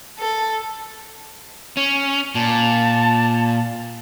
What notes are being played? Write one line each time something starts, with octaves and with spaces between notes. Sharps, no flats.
A4
C#4
A#2 A5